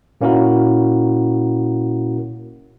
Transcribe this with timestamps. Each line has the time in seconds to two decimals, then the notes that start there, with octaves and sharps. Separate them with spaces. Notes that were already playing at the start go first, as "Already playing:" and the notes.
0.21 A#2 A#3 C#4 E4 F#4 A#4